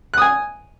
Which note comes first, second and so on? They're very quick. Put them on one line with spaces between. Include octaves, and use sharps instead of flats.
F#6 D#6 G#5